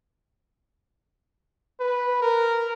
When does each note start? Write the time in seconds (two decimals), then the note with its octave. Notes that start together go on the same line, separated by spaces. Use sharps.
1.80 B4
2.22 A#4